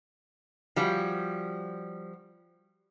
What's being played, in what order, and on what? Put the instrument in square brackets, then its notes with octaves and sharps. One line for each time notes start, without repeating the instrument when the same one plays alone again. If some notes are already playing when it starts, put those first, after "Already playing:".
[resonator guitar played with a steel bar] F3 G3 C#4 F#4